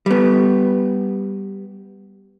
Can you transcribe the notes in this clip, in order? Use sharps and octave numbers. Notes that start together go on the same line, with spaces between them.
G3 B3